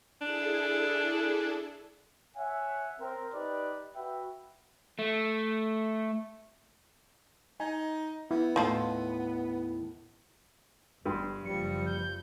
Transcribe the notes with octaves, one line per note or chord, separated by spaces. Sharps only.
D4 E4 G#4 A4
C#5 E5 F#5 G#5
C4 A#4
D#4 G4 B4 D5
F#4 B4 E5 G5
A3
D#4 G#5
B3 E4
D#2 A2 D#4 F4 A4
G1 G2 C6
F#1 F3 G3 C#7
G6